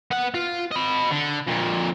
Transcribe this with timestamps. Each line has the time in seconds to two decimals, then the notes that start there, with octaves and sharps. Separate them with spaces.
0.11 B3 F#5
0.34 F4
0.71 D#5 B5
1.10 D3
1.47 F2 A#2